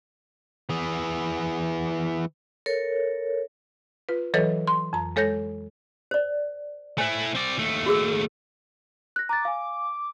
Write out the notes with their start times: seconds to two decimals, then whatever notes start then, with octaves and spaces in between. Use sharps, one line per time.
0.69 E3 G#4
2.66 A4 A#4 C#5
4.09 F4 B4
4.34 E3 F#3 A4 B4 C#5 D#5
4.67 C6
4.93 F2 A#5
5.16 G#3 A4 C#5 G6 A#6
6.11 C5 D5
6.98 A3 E4 C5 G#5
7.35 C4 D5
7.59 D#2 A3
7.86 F#4 G#4 E6
9.16 F#6 A#6
9.29 A#5 D6 F#6 A6
9.45 F5 G#5